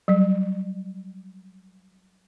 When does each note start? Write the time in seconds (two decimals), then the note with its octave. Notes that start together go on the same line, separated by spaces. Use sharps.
0.08 F#3 G3